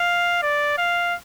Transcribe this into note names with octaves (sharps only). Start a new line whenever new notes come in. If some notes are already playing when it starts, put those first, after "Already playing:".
Already playing: F5
D5
F5